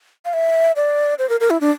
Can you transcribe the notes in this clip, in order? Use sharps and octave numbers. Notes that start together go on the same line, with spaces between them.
F5
E5
D5
C5
A#4
A#4
E4
D4